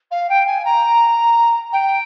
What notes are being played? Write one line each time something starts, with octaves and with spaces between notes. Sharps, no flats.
F5
G5
G#5
A#5
G5